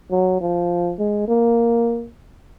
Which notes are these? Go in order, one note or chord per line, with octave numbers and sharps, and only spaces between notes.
F#3
F3
G#3
A#3